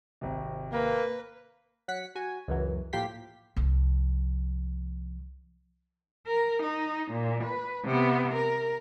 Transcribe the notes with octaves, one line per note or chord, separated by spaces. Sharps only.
G#1 C3
A#3 B4
F#3 F#5 B6 C#7
F#4 G#5
C#2 F#2 E3 F#3
A2 F3 A#3 G4 C6 B6
C2 F3
A#4
D#4
A#2
B4
C3 B3
A#4